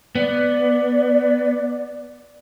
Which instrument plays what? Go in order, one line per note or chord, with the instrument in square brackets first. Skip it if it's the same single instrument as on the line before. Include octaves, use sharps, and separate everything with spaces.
[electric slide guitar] B3 [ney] D5